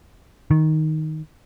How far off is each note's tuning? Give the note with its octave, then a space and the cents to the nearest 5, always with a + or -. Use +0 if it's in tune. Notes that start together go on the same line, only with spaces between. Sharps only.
D#3 +5